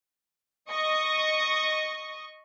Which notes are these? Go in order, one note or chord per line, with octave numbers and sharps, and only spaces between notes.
D#5 C#6 D#6